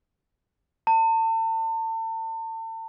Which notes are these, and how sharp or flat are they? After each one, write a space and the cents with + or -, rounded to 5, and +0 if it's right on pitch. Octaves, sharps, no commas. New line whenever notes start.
A5 +35